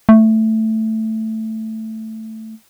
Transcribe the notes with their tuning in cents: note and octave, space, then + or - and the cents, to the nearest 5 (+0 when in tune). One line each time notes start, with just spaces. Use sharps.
A3 +5